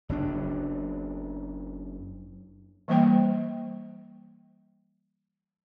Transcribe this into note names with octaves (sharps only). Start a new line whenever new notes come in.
F#1 F#3 D4
E3 G3 A#3 C5 G5